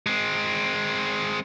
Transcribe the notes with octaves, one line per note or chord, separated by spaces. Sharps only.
G#3 C4